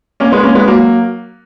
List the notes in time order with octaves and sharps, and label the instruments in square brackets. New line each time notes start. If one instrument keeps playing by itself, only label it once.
[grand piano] A#3 C#4
G#3 B3
A#3 C#4
G#3 B3
F#3 A#3